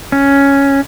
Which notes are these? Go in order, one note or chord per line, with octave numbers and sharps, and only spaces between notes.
C#4